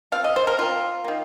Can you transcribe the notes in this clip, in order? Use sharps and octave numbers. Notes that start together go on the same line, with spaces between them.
F3 C4 F5
D#5
C5
A#4
F3 C4 F4
D#3 A#3